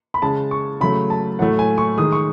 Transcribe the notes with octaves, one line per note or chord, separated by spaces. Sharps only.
B5
C#3 G#3 A5
C#6
C#3 F#3 A3 B5
A5
A2 F#3 A3 F#5
G#5
C#6
D#3 G#3 D#6
C#6